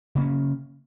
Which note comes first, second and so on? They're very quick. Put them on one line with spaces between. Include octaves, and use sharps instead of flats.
C#3 A#3 C#4